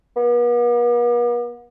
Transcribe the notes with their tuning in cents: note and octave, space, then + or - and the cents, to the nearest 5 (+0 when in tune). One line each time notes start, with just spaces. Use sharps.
B3 -45